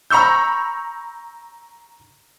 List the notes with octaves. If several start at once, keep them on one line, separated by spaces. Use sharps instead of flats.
A#5 B5 C#6 E6 G6